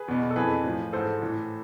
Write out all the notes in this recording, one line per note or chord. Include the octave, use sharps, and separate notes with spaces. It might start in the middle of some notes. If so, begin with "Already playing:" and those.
Already playing: G#4 B4
E2 B2
A4
F2 E3 G#4 B4
A2 F3
G#2 E3 A4 C5
A2 E3